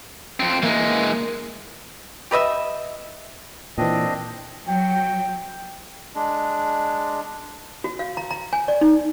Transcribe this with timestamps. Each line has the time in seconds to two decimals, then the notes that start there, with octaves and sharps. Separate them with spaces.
0.40 F2 C4
0.62 E3 G#3 A#3
2.31 G4 B4 D#5 E5
3.78 A#2 E3 C4 D4 D#5
4.68 F#3 G5
6.15 G#3 D4
7.84 F#4
7.99 F5
8.17 A#5
8.31 A#5
8.53 G#5
8.68 D5
8.81 D#4